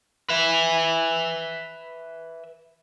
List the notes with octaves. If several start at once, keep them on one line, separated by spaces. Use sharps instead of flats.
B4 E5